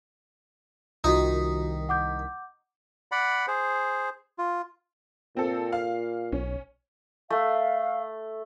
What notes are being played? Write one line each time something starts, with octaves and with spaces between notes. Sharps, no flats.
C2 D#3 D#4 F4 F#4 B6
F#5 D6 G6
D5 F#5 B5
G#4 C5
F4
A#2 C4 A4
F5
B1 C#4
A3 F5